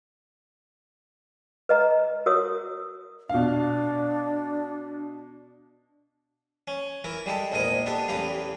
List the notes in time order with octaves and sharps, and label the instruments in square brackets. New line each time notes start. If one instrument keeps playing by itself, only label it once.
[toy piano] B4 D#5 A#5
F#4 A#4 C#5 D#6
[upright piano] B2 F5 [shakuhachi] D4
[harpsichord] C#4
E3 E4 A#4
G3 G#3 G4 A4
A#1 E2 G#2 A#4 D#5 D#6
B3 D4 G4 A4
A1 E2 E3 G4 B4 F5